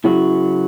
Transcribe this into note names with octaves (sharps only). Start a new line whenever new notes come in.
C#3 F#3 C#4 E4 F#4